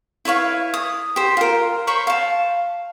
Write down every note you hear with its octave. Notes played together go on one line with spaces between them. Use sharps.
E4 B4 C#5 F5
D#6
G4 C5
F4 A#4
C5 C#5 B5 C#6
F5 A5